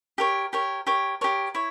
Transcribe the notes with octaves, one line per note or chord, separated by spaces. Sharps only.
G4 A#4 C#5
G4 A#4 C#5
G4 A#4 C#5
G4 A#4 C#5
E4 C#5